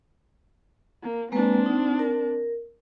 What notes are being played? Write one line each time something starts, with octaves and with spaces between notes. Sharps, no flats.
A#3
G#3 A#3 C4 D4 B4
D#4
A#4